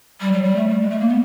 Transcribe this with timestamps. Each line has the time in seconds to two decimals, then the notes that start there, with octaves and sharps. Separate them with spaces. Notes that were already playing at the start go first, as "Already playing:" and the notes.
0.20 G3
0.32 F#3
0.43 G3
0.55 A3
0.68 G3
0.79 G#3
0.90 A3
0.99 A#3
1.09 B3